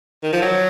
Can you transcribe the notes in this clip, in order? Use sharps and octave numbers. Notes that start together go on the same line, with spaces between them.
D#3
F3
F#3